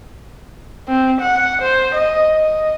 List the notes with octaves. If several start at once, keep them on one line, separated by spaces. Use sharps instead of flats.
C4
F#5
C5
D#5
D#5